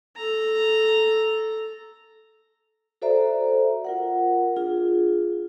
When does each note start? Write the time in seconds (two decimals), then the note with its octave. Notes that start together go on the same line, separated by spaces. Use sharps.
0.16 A4 A#5
3.02 F#4 A4 C5 D5 E5 A#5
3.85 F4 A#4 F#5
4.56 D4 F4 G#4